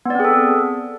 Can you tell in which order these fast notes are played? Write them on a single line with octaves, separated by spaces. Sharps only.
B3 D5 C4 G#4 A4